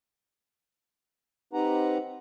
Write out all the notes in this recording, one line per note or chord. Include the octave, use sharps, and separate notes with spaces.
C4 D#4 G4 B4 F#5 A#5